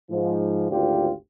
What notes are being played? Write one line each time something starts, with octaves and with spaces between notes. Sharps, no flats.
G#2 F3
G#1 D2 F4 G4